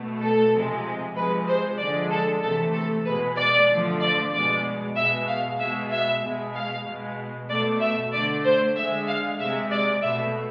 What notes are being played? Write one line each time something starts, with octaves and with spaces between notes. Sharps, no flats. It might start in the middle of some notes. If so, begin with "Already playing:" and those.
Already playing: B2 A3
A4
C3 F3 G#3
C3 F3 G#3 B4
C5
D3 F3 G#3 D5
A4
C3 E3 A3 A4
A4
B2 G#3 B4
D5
D3 F3 A3
D5
B2 G#3 D5
B2 G#3 E5
F5
B2 G#3 E5
E5
B2 G#3
F5
B2 G#3
B2 A3 D5
E5
D3 A3 D5
C5
D3 G#3 E5
F5
C3 G#3 E5
D5
B2 A3 E5